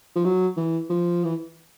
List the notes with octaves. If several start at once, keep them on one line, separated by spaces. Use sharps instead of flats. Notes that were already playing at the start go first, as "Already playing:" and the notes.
F3
F#3
E3
F3
E3